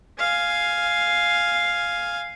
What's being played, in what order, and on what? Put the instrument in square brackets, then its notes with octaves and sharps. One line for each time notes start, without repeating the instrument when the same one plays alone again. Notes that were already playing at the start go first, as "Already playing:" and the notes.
[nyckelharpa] F5 G#5